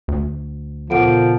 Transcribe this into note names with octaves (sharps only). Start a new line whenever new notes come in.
D2
A#2 C#3 F3 B3 A4 F#5 D7